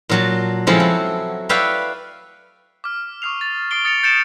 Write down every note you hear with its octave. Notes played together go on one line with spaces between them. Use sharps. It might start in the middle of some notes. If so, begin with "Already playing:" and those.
A#2 F#3 A5
C#3 F3 G#3 C4 E4 A4
F#3
B4 C#5 D5 E5 F5 G5
D6 F6
C#6 D#6 F6 C7 F7
A6
C#6 D#6 A6 C7 D7 G7
D#6 A6 C#7 D7 F7
G6 A6 C#7 D7 E7